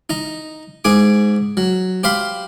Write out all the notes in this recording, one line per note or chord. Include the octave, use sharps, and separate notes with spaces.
D#4 A#5
G#2 G#4 G#5 D6
F#3
G4 C5 F5 B5 C6